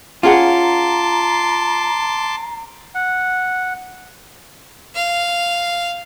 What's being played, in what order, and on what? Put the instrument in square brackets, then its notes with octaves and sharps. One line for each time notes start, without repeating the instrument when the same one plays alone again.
[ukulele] C#4 G#4 F#5 [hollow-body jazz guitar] F4 [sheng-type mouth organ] A5 C6 D6 [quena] A#5
[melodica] F#5
[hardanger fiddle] F5